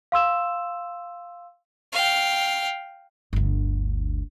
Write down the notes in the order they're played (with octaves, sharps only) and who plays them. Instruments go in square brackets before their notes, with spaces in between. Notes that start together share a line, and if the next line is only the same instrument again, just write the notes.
[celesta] F5 C6 E6 E7
[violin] F5 G5
[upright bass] G1 D2